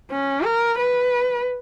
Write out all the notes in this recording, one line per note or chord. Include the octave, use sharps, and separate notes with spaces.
C#4
A#4
B4